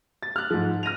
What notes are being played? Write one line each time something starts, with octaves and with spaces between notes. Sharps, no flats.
A6
F6 F#6
G#2 F3
F6 A#6 D#7 F7